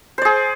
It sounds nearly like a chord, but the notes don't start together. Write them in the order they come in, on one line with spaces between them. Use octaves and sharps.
C5 D5 G#4